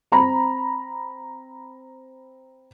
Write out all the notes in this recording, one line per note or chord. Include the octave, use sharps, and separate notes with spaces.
C4 A#5 B5